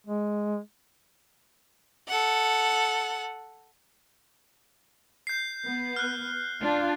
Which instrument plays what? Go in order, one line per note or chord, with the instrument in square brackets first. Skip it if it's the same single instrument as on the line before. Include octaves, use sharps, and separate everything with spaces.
[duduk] G#3
[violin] A4 F#5
[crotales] G6 C7
[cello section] B3
[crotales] F6 F#6
[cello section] D4 F4